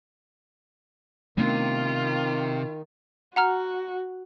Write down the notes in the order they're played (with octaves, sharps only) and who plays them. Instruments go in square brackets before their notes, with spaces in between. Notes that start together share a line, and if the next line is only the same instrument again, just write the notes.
[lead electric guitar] C3 [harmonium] D#3 [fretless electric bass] A3 B3 D4 [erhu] F4
[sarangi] F#4 [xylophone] F#5 A#5 F6